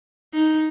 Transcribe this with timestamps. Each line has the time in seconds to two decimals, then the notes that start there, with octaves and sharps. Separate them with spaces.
0.34 D#4